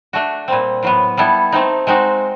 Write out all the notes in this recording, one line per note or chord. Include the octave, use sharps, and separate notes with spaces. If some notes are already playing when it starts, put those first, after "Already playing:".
A3 D4 F#4
A#2 G3 C4
A2 F#3 B3
G3 B3 E4 A4
A3 C4 D#4
G#3 C4 D#4 F#4